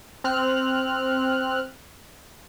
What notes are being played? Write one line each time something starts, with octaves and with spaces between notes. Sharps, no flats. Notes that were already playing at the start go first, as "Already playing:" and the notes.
C4 F6 F#6